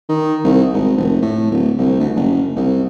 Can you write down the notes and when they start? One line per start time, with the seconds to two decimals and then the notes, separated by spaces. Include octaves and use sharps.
0.09 D#3
0.45 C2
0.74 G#1
0.97 F1
1.22 A2
1.51 D1
1.79 C2
2.00 D2
2.15 F#1
2.56 C2